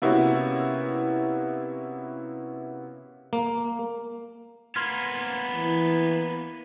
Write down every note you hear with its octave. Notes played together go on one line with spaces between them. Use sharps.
C3 A#3 B3 C#4 E4 F#4
A#3
A#3 B3 C6 F6 G#6
E3